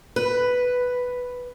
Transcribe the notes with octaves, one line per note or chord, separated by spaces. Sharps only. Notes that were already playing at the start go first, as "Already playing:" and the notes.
B4